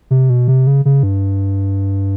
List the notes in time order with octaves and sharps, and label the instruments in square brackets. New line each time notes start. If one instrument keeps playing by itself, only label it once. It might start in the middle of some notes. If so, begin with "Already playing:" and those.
[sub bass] C3
B2
C3
C#3
C#3
G2